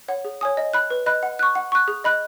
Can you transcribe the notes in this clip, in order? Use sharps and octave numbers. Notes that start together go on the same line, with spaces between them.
C#5 F#5
G#4
C#5 G#5 D#6
D#5
B5 F#6
B4
D#5 B5 F#6
F#5
C#6 F#6
F#5
C#6 F#6
G#4
D#5 B5 F#6